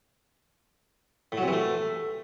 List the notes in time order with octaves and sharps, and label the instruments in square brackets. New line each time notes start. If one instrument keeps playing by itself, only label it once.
[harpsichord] A2
F#3
C3
E3
A3